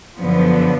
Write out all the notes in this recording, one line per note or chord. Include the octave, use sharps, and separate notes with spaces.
F#2 D3 F3 B3